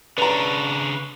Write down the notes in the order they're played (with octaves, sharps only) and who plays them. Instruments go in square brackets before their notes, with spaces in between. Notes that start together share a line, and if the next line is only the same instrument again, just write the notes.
[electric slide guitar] C#3 D4 [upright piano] B4 A#5